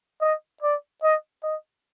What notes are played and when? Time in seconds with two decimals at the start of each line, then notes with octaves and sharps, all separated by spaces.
0.21 D#5
0.62 D5
1.03 D#5
1.43 D#5